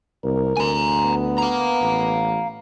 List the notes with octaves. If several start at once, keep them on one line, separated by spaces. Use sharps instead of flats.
C2 A#4
D2 G#5 A#5
B3
F5 A#5
A1